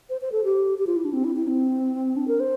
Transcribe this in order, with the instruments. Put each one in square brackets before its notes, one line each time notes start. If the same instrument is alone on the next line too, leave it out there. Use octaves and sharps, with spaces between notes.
[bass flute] C5
C5
A4
G4
G4
F4
E4
D4
C4
E4
E4
C4
D4
A#4
C5